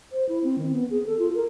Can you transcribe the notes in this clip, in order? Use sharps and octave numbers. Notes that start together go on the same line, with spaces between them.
C5
E4
C4
D#3
B3
G#4
A4
F4
A#4